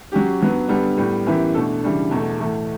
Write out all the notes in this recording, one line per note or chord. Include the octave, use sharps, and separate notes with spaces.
F#3 C#4 G4
G2 F#3 B3
G2 D3 G3 B3
A2 G3 B3
F#2 E3 B3 E4 G4
B2 A3 D4 A4
C#3 E3 G3 D4
E2 B2 A3
A2 E3 A3